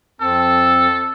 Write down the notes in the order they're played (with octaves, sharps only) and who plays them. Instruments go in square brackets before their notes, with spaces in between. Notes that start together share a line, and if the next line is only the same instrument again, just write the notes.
[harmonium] F2 C4 A5 [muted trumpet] A4